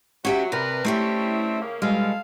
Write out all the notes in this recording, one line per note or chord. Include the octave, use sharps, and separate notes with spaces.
F#3 C#4 F#4 G4 E5
C3 D4 A#4 B4
G3 A3 C4 C#4 E4 G4
C#3 A#3
B2 G3 G#3 F4 A4 F5